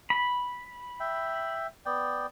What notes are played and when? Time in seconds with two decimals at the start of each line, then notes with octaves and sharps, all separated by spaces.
0.10 B5
1.00 E5 G5
1.86 B3 D5 G5